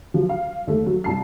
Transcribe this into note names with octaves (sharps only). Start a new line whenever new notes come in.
F3 F#3
F5
D#2 A3
F#3
C2 A5 C7